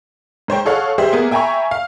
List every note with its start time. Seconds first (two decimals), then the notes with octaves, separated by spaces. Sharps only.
0.48 G#2 C5 C#5 G5
0.65 G#4 A4 C#5 F5 F#5
0.98 G3 G4 G#4 C5 E5
1.13 A#3 B3 G#4
1.31 E5 G5 G#5 A#5 B5 C#6
1.71 F5